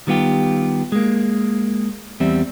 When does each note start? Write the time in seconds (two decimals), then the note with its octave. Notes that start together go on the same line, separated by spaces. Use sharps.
0.07 D#3 G3 B3 F4 G4
0.92 G#3 A#3
2.20 E2 G3 C4 E5